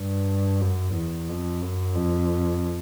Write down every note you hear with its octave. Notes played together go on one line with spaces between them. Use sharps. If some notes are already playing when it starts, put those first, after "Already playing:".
Already playing: G2
F#2
E2
F2
F#2
F2